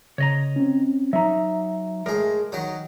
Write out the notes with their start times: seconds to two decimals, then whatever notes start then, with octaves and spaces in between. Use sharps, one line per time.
0.18 C#3 C#5 D#5 A#5
0.56 C4 C#4
1.13 F#3 D#4 E5 A#5
2.06 A2 G#3 A#4
2.52 D#3 F#3